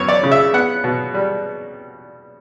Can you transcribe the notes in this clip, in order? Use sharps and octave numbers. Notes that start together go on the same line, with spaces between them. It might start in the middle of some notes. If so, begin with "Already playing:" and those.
Already playing: F#2 B3 C#5
D5
C#3
E5
B3 F#5
B2
G3